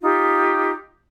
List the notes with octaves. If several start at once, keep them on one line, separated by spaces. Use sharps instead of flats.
D#4 F4 G4